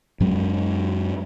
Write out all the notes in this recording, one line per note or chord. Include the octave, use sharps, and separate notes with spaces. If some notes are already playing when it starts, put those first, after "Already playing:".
F#2 F#3 G#3 C#4